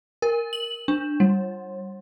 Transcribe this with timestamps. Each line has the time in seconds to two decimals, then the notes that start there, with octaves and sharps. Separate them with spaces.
0.22 A#4
0.53 F#7
0.88 D4
1.20 G3